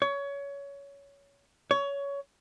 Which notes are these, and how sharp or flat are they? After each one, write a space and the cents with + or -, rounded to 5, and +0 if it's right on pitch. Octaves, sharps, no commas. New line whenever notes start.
C#5 +20
C#5 +20